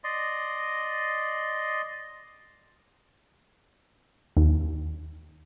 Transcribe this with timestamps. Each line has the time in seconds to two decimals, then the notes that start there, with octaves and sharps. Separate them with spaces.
0.04 D5 D#5 C6
4.37 D#2